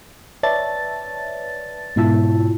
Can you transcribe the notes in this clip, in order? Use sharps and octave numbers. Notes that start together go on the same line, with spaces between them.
B4 C#5 D5 E5 A5 A6
G#2 B2 E4 F4 E5 A5